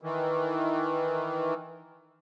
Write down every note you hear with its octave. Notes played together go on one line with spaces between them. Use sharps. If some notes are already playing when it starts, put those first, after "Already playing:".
D#3 E3